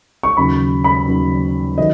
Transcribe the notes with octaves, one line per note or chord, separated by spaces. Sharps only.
C#6
D#2 C#3 F#3 B5
B5
D#2 C#3 F#3
D#3 F#3 D#5